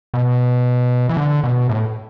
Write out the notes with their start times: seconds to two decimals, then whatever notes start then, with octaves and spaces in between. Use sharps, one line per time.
0.14 B2
1.09 E3
1.17 D3
1.44 B2
1.69 A2